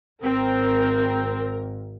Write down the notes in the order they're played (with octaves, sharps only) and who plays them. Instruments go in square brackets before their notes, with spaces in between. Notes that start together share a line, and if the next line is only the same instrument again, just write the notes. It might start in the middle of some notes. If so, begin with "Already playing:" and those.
[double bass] G#1 [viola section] C4 [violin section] A#4